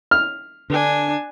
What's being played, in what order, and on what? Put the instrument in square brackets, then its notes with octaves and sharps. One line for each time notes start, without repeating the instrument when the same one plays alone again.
[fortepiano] F6
[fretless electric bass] D3 [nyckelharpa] D4 G#5